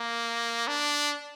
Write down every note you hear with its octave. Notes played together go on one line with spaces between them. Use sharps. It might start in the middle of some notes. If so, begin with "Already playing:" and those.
Already playing: A#3
D4